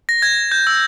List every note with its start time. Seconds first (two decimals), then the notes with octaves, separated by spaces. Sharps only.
0.09 A#6
0.22 G#6
0.52 G6
0.67 E6